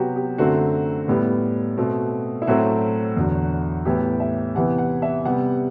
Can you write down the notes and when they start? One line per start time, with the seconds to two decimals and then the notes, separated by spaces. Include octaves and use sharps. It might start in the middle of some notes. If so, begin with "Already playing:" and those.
Already playing: C3 F#3 B3 F#4 G4
0.16 G4
0.38 F#2 D3 A3 C4 F#4
1.08 A2 G3 B3
1.77 B2 A3 C4
2.42 E4
2.47 A2 F#3 A3 C4 F#4
3.17 E2 D3 F#3
3.85 A2 E3 B3 G4
4.20 E5
4.55 C3 E3 B3 F#5
4.78 F#5
5.02 E5
5.25 C3 G3 B3 F#5